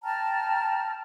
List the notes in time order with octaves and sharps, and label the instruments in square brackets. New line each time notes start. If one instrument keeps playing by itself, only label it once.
[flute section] G5 A5 A#5 F6